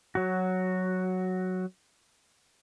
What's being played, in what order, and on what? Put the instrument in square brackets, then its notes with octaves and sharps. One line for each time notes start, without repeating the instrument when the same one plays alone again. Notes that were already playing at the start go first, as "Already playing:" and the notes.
[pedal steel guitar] F#3 F#4